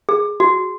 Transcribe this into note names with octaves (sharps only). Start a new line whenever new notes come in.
G#4
F#4